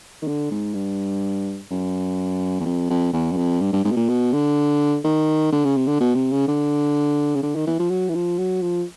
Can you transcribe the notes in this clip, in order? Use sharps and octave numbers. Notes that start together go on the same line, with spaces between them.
D#3
D3
G#2
G2
F#2
E2
F2
F2
E2
F#2
F2
G2
G2
G#2
B2
A#2
B2
D3
D#3
D3
C#3
C3
D3
B2
C3
C#3
D3
C#3
D3
D#3
E3
F3
F#3
E3
F3
F#3
F3